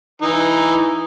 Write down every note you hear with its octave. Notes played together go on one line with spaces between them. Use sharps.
E3 D#4